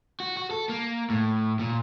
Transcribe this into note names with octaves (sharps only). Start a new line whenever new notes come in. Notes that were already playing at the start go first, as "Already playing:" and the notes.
F#4
F#4
A4
A#3
A2
A#2